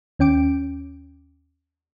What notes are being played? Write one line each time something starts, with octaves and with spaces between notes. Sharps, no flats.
D#2 C#4 G5 D6 D7